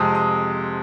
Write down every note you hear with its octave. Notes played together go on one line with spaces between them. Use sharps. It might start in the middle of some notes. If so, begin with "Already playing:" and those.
Already playing: F2 C3 G#3 D#6
D#6